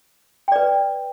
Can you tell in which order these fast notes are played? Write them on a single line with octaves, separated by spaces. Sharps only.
G5 D5 B4